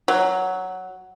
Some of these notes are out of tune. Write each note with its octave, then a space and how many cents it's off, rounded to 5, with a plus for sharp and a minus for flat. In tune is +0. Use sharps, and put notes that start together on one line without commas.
F#3 +5